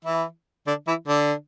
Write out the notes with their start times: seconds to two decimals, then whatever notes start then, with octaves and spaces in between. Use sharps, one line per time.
0.05 E3 E4
0.67 D3 D4
0.87 E3 E4
1.07 D3 D4